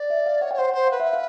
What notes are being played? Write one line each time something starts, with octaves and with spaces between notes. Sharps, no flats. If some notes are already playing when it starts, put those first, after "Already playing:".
Already playing: D5
E5
F5
C#5 F#5
G5
C#5
C5 F#5
C5 F#5
B4 F5
E5
F5